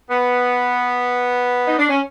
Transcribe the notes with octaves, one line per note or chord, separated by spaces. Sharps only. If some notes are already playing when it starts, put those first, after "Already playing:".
B3
D#4
D4
C#4